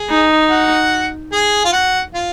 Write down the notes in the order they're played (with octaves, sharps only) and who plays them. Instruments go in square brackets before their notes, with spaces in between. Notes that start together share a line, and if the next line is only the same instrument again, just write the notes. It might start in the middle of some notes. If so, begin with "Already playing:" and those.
Already playing: [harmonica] G#4
[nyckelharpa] D#4
[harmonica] F#4
G#4
F4
F#4
F4